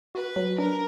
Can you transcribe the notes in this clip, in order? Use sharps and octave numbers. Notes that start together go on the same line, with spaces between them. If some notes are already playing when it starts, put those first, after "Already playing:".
F#4 B4
F#3
D4 A#4